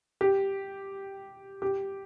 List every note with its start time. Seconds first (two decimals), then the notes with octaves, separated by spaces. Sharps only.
0.21 G4
1.62 G4